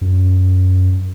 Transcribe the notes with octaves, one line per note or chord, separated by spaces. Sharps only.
F#2